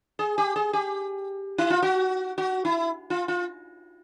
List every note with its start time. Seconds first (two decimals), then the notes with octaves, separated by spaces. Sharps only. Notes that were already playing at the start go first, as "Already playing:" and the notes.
0.19 G#4
0.38 G4
0.56 G#4
0.73 G4
1.58 E4
1.70 F4
1.82 F#4
2.38 F#4
2.65 E4
3.10 F4
3.28 F4